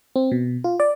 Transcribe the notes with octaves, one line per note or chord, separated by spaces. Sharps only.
C4
B2
F4
D5